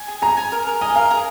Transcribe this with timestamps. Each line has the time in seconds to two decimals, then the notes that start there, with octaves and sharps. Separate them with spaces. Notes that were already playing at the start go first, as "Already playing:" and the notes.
Already playing: G#5
0.08 G#4
0.22 G#4 A#5
0.37 G#5
0.52 A#4
0.67 A#4
0.81 D#5 G#5
0.95 A#4 F5
1.11 G#4